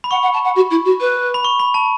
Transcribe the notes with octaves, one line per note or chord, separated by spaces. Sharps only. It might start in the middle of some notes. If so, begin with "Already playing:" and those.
B5
F#5 C#6
F#5
A5
F#5
F#4
E4
F#4
B4
B5
C#6
B5
A5